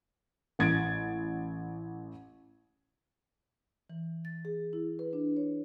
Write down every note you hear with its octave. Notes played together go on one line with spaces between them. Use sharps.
A1 G#6 A6 D7
E3
A6
G#4
E4
B4
D4
C#5